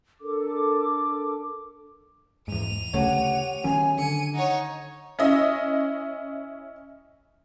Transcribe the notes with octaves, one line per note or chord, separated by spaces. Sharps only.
D4 A4 A#4 D6
E2 G#2 D#7 F7
D2 C#3 A3 G4 C#5 F#5
D#3 F#3 C#4 G#5
D3 C#7 D#7
D#4 C#5 F#5
C#4 E4 D#5